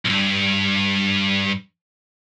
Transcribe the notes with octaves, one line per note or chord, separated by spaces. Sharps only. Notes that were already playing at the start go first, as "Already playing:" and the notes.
B1 G2